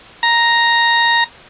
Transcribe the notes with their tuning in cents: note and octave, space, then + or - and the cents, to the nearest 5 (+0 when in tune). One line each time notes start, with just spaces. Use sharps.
A#5 +5